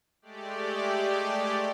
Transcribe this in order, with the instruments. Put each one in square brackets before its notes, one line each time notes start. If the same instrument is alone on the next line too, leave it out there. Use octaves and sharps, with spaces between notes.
[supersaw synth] G#3 A3 G4 D5